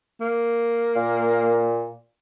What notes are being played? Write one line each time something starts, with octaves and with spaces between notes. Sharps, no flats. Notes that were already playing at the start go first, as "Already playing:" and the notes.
A#3
A#2